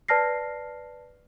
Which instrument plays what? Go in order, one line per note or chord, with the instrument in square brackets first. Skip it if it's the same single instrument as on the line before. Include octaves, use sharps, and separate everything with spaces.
[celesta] B4 D5 A5 F6 A#6 C7